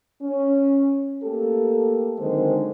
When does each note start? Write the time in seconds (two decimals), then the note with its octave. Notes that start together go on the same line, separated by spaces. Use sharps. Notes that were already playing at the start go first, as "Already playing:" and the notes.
0.22 C#4
1.23 A3 A#3 G4 A4
2.19 D3 D#3 F#3 G#3 C4 C5